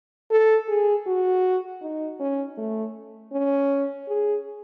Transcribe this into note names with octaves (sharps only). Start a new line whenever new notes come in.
A4
G#4
F#4
D#4
C#4
A3
C#4
G#4